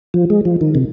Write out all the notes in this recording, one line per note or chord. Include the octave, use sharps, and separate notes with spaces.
F3
G#3
F3
D#3
C3